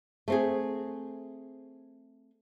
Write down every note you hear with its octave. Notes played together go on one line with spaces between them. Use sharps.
A3 C4 G#4